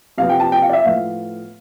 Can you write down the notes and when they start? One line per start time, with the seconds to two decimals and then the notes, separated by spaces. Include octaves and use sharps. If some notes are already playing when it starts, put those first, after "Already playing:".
0.18 C3 F3 B3 F5
0.30 G5
0.40 A5
0.52 G5
0.62 F5
0.69 D5
0.73 E5
0.85 A2 F3 B3 F5